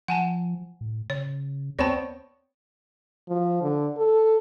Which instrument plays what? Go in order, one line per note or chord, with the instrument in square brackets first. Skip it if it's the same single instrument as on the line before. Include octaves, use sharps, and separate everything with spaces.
[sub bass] F3 [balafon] F#5 G#5 A5
[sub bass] A2
[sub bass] C#3 [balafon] C#5
[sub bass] D#2 [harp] B3 C4 C#5 [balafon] D5 A5
[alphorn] F3
D3
A4